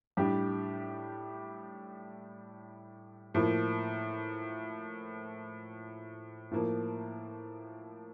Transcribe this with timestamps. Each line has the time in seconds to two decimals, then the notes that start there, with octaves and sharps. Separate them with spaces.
0.17 A2 G3 D4 G4
3.34 A2 F3 A#3
6.51 A2 F3 A#3